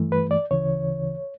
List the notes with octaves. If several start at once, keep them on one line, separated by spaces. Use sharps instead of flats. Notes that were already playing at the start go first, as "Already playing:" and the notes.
Already playing: G2 E3 A3
B4
D5
D2 C#3 E3 C#5